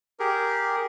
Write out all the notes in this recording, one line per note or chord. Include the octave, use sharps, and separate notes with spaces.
G4 G#4 A#4